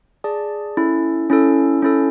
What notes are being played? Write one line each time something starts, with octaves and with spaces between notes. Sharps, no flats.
G#4 D5 A5
C#4 E4 A4
C#4 E4 A4
C#4 E4 A4